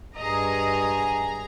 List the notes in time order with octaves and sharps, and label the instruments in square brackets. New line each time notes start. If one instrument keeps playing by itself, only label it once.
[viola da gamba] G2 D#5 [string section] G#4 A#5